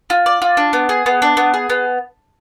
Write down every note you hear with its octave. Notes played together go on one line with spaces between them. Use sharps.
F4
D5
F4
D4
B3
G#4
B3
D4
B3
G#4
B3